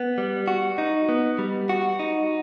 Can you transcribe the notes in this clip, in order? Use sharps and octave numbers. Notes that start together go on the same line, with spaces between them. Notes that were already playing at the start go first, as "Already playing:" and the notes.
Already playing: B3
G3
F#4
D#4
B3
G3
F#4
D#4